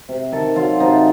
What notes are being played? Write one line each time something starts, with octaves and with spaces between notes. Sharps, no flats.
C3
D#3 A4
F#3 F4
C3 D#4